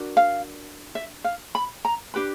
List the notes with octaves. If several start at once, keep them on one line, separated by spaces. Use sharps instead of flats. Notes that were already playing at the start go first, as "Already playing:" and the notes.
Already playing: D4 F#4 A#4
F5
E5
F5
B5
A#5
D4 G4 B4 B5